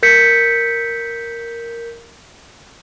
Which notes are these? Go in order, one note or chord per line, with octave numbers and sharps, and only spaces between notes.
A#4 G6 B6 C#7